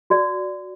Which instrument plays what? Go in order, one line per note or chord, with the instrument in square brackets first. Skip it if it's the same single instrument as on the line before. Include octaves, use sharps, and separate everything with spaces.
[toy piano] F#4 D5